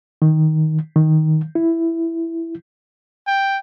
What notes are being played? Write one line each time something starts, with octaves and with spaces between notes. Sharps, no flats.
D#3
D#3
E4
G5